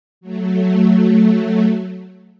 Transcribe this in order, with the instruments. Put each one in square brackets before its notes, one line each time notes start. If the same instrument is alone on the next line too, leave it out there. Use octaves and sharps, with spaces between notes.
[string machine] F#3 A3